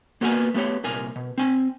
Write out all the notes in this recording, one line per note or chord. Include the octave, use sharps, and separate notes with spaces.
A#3 B3 F#4 A4 A#4 G#5
A3 B3 G4 C#5
C2 A#2 A#4 G#5
B2
C4 G#5